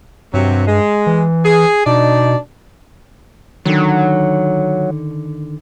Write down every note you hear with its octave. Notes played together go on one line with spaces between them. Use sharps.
G2 C3 F#3
G#3
E3
G#4
B2 D4 D#4 D5
D3 D#3 F#3